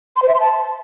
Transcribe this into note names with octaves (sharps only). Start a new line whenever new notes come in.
C6
C5
E5
C6
A5